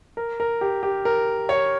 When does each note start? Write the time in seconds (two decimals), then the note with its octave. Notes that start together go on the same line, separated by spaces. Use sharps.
0.17 A#4
0.40 A#4
0.61 G4
0.83 G4
1.05 A#4
1.49 C#5